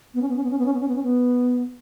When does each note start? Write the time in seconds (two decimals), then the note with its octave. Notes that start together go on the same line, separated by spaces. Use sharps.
0.14 B3
0.22 C#4
0.28 B3
0.36 C#4
0.43 B3
0.51 C#4
0.58 B3
0.66 C#4
0.74 B3
0.80 C#4
0.88 B3
0.96 C#4
1.03 B3